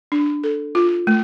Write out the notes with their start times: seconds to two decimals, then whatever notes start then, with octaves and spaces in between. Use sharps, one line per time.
0.12 D4
0.44 A4
0.75 F4
1.07 A3